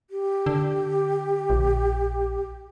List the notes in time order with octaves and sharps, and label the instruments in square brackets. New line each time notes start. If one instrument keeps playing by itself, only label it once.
[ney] G4
[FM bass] D3
A#1